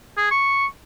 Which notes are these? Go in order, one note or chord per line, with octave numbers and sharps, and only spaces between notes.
G#4
C#6